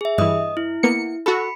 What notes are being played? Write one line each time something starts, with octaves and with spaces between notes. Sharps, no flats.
G#4 E5
G2 E3 D#5 D#6
E4
A#3 B3 C#7
F#4 A4 B5 C#7